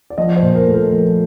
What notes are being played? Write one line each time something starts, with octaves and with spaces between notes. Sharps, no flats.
D5
F3 D#5
C5
A#2
A#4
A3
A#4
F3